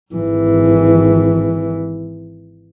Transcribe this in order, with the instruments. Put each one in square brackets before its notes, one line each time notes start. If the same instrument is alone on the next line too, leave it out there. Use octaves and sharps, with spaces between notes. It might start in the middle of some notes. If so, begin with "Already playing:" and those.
[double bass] G#1 E3